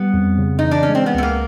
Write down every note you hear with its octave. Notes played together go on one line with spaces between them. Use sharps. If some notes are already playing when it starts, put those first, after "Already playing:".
Already playing: G3 B3
F2
C#3
D#4
E3
D4
C#4
G#3
C4
B3
C#2 A3
A#3